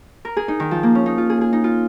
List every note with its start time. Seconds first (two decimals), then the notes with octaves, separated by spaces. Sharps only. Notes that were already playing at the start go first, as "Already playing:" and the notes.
0.25 A#4
0.37 G#4
0.48 D#4
0.60 D#3
0.71 F3
0.83 A#3
0.95 C#4
1.06 D#4
1.18 F4
1.30 G#4
1.41 G#4
1.53 D#4
1.64 F4